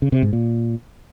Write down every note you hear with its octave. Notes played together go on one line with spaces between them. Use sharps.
C#3
C3
G#2
A#2